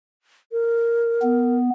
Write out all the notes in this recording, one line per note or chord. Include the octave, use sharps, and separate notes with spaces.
A#4
B3